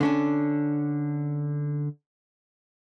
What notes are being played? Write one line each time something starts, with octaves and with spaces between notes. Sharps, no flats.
D3 C#4 D4